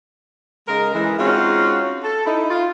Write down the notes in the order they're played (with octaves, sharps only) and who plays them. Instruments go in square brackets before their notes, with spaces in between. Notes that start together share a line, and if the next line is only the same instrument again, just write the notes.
[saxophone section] C#3 G#3 D#4 A#4
E3 G#3
G#3 C4 C#4 D#4 F4 F#4
A4
D#4 E4
F4